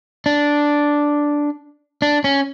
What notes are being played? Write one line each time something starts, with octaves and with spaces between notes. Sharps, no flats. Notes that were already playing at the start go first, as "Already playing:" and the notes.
D4
D4
C#4